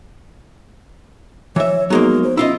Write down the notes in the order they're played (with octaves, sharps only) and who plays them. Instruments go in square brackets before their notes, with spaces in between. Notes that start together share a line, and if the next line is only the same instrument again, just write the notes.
[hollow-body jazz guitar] E3 E5 [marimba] F3 [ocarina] C#5
[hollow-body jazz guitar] F#3 G#3 A#3 [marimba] B3 D#4 [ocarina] G#4
[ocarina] C5
[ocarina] C#4 [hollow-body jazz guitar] E4 F4 D#5